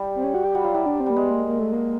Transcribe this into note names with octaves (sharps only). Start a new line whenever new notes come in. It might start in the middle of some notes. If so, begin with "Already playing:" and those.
Already playing: G3
C4
C#4
F#4
G4
G3 F#4
F#3 F4
G3 E4
D4
C4
G3 A#3
G#3 B3
A#3
A#3
A3
A#3